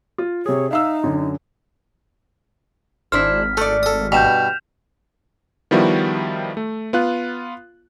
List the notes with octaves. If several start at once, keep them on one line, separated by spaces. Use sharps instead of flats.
F4
C3 G#4 C#5
D#4 E5 F5 E6
F#2 D3
G#1 D4 E4 C5 F6 B6
A3 A4 D5
A4 D#6
G2 B2 G6 E7 F7
D#3 F3 G3 B3 E4 F#4
A3
B3 F4 F#6